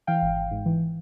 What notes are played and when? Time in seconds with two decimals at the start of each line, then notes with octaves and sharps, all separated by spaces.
0.07 E3 F5 G5
0.22 G#1
0.36 G#1
0.51 G#2
0.66 E3